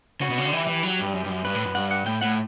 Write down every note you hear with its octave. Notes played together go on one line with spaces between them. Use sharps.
C#3 F#4
B2
C#3
D3
E3 G4
E3
F#3
G2
F#2
G2
F#2
G2 B4
A2
F#2
G2 F#5
F#5
A2 G5
A2 F#5